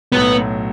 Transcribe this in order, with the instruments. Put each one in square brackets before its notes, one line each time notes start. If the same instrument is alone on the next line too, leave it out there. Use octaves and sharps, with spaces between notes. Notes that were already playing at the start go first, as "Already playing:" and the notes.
[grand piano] B1 A2 F#3 [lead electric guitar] B3